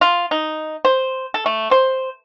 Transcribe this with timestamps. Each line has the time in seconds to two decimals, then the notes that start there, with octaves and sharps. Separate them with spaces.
0.01 F4
0.31 D#4
0.85 C5
1.34 A4
1.46 A3
1.71 C5